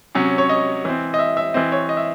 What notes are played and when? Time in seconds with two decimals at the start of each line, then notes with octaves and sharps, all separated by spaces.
0.15 C3 F#3 C#4
0.38 C#5
0.49 D#5
0.85 E3 C4
1.14 D#5
1.19 E5
1.37 E5
1.54 E3 C4 D#5
1.72 C#5
1.89 D#5
1.97 E5